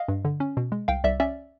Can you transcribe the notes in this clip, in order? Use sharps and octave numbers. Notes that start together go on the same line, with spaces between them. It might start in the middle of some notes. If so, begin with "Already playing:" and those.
Already playing: D#5 F5
G2
D3
C#4
B2
G#3
C2 F5 G5
C2 D5 E5
C#4 D5 E5